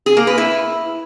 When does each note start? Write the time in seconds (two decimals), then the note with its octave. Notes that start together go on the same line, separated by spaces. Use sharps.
0.06 G#4
0.17 A#3
0.27 B4
0.38 E4